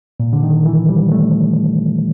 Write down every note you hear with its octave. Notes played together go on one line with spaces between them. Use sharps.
A#2
D3
D#3
E3
G3
A3